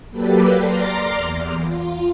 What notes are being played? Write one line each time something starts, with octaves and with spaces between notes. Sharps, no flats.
F#3 A#3 G4 A4 B4 D5
D5 A#5 C6 D6 F6
E2
F4